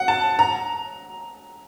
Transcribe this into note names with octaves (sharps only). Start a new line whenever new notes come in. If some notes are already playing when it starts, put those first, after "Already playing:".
Already playing: F#5
A5
A#5